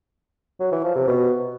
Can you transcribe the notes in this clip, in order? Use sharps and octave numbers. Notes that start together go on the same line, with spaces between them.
F#3
E3
F3
C3
B2